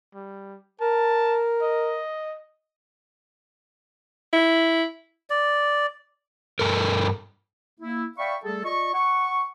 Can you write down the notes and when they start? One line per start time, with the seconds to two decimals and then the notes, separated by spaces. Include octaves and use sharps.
0.14 G3
0.81 A#4 A5
1.62 D#5
4.33 E4
5.30 D5
6.59 G2 A4 A#4
7.80 A#3 E4
8.18 D5 E5 F5 G5 B5 C#6
8.44 G3 A3 G#4 A4
8.65 F4 D5 D#5 C#6
8.94 F#5 C#6